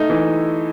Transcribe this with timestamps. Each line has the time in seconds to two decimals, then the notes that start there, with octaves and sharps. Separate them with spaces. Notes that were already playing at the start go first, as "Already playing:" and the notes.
Already playing: A3 D#4
0.10 E3